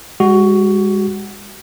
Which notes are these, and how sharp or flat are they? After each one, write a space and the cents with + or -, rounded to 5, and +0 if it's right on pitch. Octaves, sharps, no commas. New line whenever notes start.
G#3 -35 F#4 +10